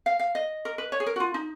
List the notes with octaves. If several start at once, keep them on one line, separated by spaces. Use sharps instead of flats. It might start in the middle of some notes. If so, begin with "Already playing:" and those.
F5
F5
D#5
A#4
B4
C#5
G#4
A#4
F#4
F4
D#4